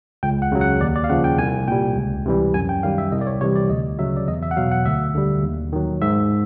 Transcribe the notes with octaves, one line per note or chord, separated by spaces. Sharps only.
C#2 G5
F#5
C#3 F#3
F#5
D#2 D5
D5
F5
C#3 F3 F#5
G5
C2 G#5
A#2 G3 G5
C#2
C3 E3 G3
F#2 G#5
G5
D#3 G3 F5
E5
C2 D#5
D5
C#5
C3 E3 G3 C#5
D5
D2 D#5
C#3 F#3 E5
D5
E2 D#5
E5
F#5
B2 F#3 F5
F#5
D2 E5
D3 G3
D#2
D#3 F#3
G#2 E5